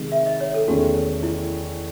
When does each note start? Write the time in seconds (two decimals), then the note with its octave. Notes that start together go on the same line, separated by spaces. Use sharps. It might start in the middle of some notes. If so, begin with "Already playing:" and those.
Already playing: C3 D#3 G#3 D#4
0.12 E5
0.26 D#5
0.41 C#5
0.54 A4
0.67 E2 D#3 A3 C#4 F#4 G#4
1.23 E4